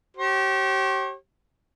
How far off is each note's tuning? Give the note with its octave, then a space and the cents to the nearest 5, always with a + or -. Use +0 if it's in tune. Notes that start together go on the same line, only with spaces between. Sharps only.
G4 -30 C#5 -45